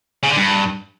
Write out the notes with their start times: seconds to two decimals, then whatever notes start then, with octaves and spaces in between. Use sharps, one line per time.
0.23 C#3
0.30 D3
0.37 G2